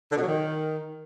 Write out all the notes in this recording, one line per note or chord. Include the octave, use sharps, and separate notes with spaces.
D3
B2
F#3
D#3